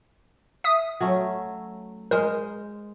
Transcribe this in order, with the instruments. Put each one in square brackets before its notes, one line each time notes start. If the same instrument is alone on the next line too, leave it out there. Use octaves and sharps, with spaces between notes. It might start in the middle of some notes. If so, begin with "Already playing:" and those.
[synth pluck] E5 D#6
[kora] F#3 A3 C#4
[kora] G#3 C5 [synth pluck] A#4